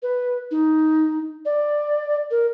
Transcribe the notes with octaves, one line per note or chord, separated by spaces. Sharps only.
B4
D#4
D5
A#4